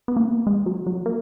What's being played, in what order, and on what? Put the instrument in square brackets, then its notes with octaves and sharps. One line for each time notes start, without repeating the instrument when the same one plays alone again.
[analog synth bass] B3
A#3
G#3
F#3
F#3
A#3